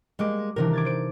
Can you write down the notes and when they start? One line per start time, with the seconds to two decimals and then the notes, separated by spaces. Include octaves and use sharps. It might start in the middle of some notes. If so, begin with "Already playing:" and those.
0.19 G3 G#3 A#3 D6
0.56 C3 D#3 E3 D4 A#4
0.73 D6 G#6 A6
0.85 C5 D7